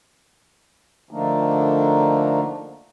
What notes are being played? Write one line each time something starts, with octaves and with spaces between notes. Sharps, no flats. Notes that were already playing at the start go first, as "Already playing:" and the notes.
D3 F3 A3 A#3 D4 D#4